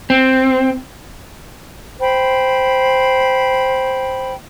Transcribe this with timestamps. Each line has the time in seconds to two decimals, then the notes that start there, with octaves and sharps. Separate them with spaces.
0.10 C4
2.00 C5 G5 B5